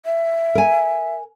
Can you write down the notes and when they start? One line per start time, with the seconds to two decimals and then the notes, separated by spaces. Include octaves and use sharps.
0.05 E5
0.55 A#4 G#5